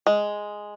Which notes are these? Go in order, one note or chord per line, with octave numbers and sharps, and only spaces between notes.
G#3